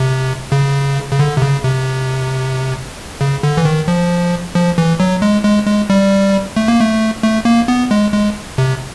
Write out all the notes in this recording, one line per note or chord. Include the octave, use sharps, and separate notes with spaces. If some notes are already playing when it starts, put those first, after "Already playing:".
Already playing: C3
C#3
C#3
D3
C3
C#3
C3
C#3
D3
E3
D#3
F3
F3
E3
F#3
G#3
G#3
G#3
G3
A3
A#3
A3
A3
A#3
B3
G#3
G#3
C3